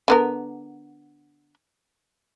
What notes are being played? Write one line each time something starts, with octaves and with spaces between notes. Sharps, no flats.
D3 B3 A#4